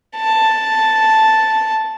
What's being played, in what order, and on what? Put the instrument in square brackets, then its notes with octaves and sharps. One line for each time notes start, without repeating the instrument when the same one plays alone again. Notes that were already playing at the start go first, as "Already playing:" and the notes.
[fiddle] A5